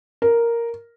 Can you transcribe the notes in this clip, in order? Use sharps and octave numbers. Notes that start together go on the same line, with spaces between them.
A#4